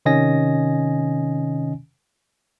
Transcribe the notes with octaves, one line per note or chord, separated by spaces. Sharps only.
C3 D#3 C#4 D#5 G#5 A#6